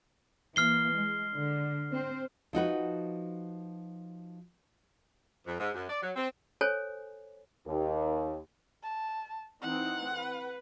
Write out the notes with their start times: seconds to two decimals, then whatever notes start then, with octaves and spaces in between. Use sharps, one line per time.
0.56 E3 A#3 F6 C7 G7
0.94 G#3
1.35 D3
1.90 C4 C5
2.53 F3 D#4 F#4 B4
5.47 F2
5.60 G#2
5.75 F#2
5.90 D5
6.02 F#3
6.16 C4
6.61 A4 C5 C#5 G#5
7.67 D#2
8.83 A5
9.62 E3 C4 D#4 F#5
10.14 B4